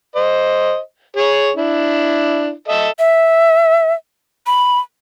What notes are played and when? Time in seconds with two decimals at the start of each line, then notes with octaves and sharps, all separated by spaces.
0.16 C5 D#5
1.17 G#4 C#5
1.56 D4 E4
2.68 A4 D#5 E5
2.99 E5
4.46 B5